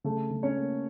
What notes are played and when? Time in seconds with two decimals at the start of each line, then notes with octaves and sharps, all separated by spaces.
0.04 C#3 A3 A4
0.30 C#3
0.43 C#4 C#5
0.57 A#3